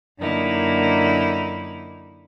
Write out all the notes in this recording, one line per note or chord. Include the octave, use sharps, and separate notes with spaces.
F#2 D3 A#3 D#4 E4